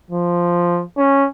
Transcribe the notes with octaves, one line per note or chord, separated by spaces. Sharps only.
F3
C#4